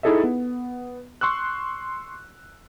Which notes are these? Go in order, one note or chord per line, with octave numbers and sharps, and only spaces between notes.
D#4 E4 G#4 A4 D#5 E5
B3
C6 C#6 E6 F#6